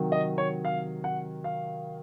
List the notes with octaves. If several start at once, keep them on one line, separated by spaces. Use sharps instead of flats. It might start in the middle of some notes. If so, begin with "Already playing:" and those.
Already playing: C3 D#3 F#3
D#5
C#5
F5
F#5
F5